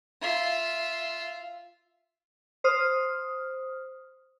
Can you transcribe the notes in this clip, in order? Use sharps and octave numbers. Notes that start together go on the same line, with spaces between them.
F4 E5
C5 D#6 F6